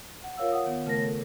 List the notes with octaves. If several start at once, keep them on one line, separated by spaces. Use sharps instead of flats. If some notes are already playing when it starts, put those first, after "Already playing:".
F#5
F4 A#4 C#5 F5 E6
F#5 D#6
D#3 B3
C#3 A3 A#4 A#6
A4